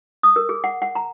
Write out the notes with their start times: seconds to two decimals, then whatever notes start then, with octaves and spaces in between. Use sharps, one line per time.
0.23 D#6
0.36 A#4
0.49 G#4
0.64 F#5
0.82 F#5
0.95 A#5